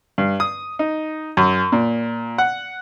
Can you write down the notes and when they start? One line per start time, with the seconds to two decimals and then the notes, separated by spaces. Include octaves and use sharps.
0.18 G2
0.40 D#6
0.79 D#4
1.37 F#2
1.72 A#2
2.38 F#5